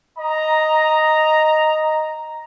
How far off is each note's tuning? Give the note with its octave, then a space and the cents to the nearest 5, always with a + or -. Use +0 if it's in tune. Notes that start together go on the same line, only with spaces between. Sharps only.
D#5 +0 A#5 +0